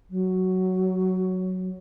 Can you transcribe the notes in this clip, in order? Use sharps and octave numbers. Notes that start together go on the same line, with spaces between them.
F#3